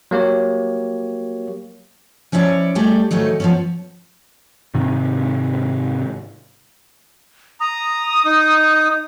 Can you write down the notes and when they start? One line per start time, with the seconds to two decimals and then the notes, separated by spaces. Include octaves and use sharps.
0.11 F#3 A#3 G4 C#5
2.32 F3 C#4 E4 C#5 D5
2.75 G3 A3 G4 G#4 D5
3.11 G#2 D#3 F#3 A3 D#4
3.40 F3 B3 C#4
4.75 G#2 C3 D#3
7.60 A#5 D#6
8.25 D#4